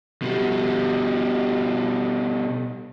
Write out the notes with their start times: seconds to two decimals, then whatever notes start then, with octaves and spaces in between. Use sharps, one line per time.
0.22 B2 G3